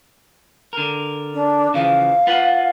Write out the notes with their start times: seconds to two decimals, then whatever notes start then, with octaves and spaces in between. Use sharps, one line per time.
0.73 D3 A#4
1.34 D4
1.74 C#3 E3 F3 F5
2.27 F4 B4 F#5